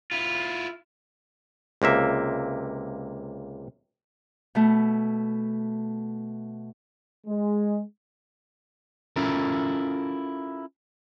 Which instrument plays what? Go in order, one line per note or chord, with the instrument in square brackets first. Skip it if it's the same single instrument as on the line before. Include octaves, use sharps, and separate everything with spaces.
[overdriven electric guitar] E4 F4
[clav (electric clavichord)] C#2 C3 A#3 E5
[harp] B2 A3
[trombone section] G#3
[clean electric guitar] C#4 E4 F4 A4 A#4